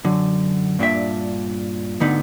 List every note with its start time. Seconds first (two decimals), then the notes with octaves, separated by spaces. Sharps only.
0.05 F#2 D3
0.79 G2 A#2 D4 E5
2.00 D2 G#2 D3 B3 D#4